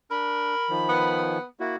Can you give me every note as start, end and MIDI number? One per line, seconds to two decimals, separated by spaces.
0.11 0.55 62
0.11 0.74 70
0.11 1.22 83
0.69 1.38 51
0.69 1.38 53
0.89 1.44 59
1.60 1.76 58
1.60 1.76 64
1.60 1.76 66